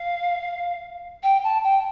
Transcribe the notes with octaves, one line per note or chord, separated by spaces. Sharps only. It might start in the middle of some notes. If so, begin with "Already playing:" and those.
Already playing: F5
G5
A5
G5